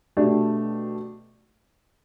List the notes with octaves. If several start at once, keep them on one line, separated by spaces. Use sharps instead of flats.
B2 A3 D4 G4